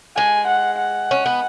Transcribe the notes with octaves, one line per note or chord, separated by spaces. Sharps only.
G#3 G#5
F#5
F#5
C#4
B3